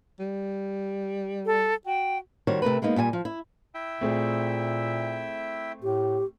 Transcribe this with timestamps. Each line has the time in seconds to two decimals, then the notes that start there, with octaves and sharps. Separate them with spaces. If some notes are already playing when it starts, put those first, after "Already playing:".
0.20 G3
1.46 A4
1.86 F#4 G5
2.47 D#3 G3 F#4 C5 C#5
2.62 C3 A3 A#4 B4
2.82 G#3 A#3 B3 D#4
2.96 A#2 G3 G5 G#5
3.13 F3
3.25 E4
3.75 E4 E5 G5
4.01 A#2 A3 C4 G#4
5.83 A2 G4